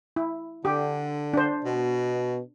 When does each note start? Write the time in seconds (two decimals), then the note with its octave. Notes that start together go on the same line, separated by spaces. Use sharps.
0.16 E4
0.65 D3 G4
1.33 D4 C5
1.64 B2